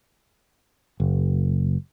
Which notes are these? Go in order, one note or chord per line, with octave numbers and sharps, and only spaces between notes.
F#1